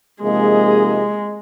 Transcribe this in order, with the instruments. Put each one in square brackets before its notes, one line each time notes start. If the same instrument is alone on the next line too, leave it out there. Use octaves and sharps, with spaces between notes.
[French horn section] C3 F3 A#3 D#4 G#4 [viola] G#3